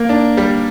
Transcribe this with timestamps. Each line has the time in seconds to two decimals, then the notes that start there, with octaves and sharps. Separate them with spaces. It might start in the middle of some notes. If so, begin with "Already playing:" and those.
Already playing: A#3 A#4
0.09 D4
0.37 G3